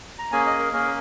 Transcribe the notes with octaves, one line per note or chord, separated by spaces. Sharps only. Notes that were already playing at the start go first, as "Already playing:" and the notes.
A#5
A#3 C#4 G#4 G#5
D#5
A#4
A#3 C#4 G#4 A#4